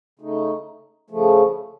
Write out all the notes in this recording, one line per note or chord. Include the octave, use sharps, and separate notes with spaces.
C#3 A3 D#4
C#3 F3 A3